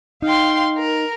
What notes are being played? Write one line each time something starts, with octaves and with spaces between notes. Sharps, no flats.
D#4 F5 G5 C6
A#4